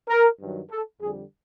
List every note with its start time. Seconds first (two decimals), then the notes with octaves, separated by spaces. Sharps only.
0.09 A#4
0.40 G2 D#3 F#3
0.70 A4
1.01 F2 D3 G3 G#4